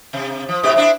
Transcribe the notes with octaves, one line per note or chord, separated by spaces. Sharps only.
C3
F3
G#2 B2 G4
C4 D4 E4